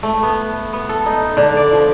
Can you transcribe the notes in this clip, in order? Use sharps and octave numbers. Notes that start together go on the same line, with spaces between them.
A3
B3
B3
A4
D#4
D3
D5
F3